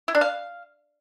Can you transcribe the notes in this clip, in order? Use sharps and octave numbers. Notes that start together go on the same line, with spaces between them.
E4
D4
F5